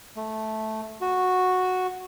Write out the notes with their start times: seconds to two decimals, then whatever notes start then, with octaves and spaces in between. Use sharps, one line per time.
0.16 A3
1.01 F#4